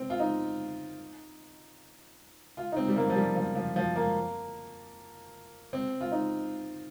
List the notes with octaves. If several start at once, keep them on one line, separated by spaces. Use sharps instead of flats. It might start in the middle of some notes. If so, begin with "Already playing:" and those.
Already playing: C4
F4
D#4
F4
D#4
C4
G3
A#3
F3
G3
F3
F3
F3
A#3
C4
F4
D#4